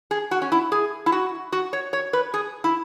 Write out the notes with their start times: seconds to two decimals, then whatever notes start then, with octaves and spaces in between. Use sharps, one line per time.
0.11 G#4
0.31 F#4
0.42 C#4
0.52 E4
0.72 G#4
1.06 E4
1.12 F#4
1.52 F#4
1.73 C#5
1.93 C#5
2.13 B4
2.34 G#4
2.64 E4